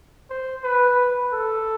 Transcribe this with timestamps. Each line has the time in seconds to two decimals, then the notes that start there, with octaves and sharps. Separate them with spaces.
0.30 C5
0.64 B4
1.33 A4